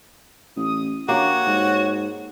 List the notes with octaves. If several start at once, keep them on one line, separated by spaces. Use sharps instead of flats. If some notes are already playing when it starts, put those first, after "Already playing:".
A1 D#6
A#1 A#3 F#4 G4 C#5
G#2